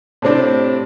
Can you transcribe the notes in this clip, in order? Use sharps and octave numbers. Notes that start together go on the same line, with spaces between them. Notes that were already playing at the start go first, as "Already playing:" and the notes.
A2 C3 C4 D4